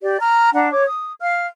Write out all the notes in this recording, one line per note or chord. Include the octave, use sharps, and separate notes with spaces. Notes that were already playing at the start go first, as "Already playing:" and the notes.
G4 D5
A#5 F6
D4 F#5 A#5
C#5 D6
D#6
F5 F6